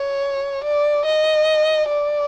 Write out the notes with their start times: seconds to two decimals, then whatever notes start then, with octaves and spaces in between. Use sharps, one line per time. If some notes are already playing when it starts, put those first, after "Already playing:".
Already playing: C#5
0.64 D5
1.05 D#5
1.88 D5